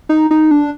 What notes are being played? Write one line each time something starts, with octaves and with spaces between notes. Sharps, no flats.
D#4
D#4
D4